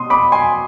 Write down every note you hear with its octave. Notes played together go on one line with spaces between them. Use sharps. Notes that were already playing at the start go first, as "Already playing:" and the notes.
Already playing: B2 C6 D#6
B5 D6
G#5 C6